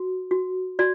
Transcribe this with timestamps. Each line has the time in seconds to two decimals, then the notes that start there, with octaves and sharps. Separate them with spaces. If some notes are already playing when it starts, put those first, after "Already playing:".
Already playing: F#4
0.31 F#4
0.79 F#4 D5